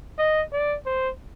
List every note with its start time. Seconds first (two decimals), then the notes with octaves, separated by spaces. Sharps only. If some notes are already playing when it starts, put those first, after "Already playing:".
0.19 D#5
0.53 D5
0.86 C5